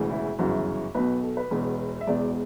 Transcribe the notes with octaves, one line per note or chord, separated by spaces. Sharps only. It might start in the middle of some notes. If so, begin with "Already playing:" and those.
Already playing: E1 D2 C#3 E3
E4
G1 F#2 C#3 E3 F#4
B1 B2 B4
A4
B4
E1 E2 B2
E5
E1 E2 B2 D5